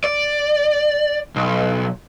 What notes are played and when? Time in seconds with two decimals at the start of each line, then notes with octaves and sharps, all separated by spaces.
0.04 D5
1.36 B1